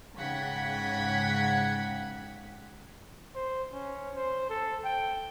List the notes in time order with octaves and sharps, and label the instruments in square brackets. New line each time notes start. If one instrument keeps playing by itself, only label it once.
[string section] G#2 C#3 F#5 G5 G#6 B6
[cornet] C5
C#4
C5
A4
G5